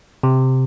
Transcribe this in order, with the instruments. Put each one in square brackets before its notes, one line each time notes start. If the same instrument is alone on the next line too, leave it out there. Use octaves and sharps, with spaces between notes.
[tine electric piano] C3